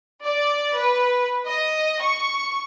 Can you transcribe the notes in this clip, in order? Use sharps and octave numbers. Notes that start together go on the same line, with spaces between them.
D5
B4
D#5
C#6